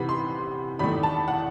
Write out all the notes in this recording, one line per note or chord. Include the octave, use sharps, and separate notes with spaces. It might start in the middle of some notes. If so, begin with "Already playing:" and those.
Already playing: C3 E3 B3 B5
C6
E2 D#3 A3 B5
A5
F#5